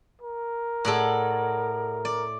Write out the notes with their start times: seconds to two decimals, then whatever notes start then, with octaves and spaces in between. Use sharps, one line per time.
0.22 A#4
0.85 A2 G#4 A4 D5 F#5
2.05 D5